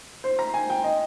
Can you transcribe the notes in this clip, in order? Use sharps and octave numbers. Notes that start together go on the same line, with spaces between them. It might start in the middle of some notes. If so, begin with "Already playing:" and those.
C5
A#5
G#5
G5
D#5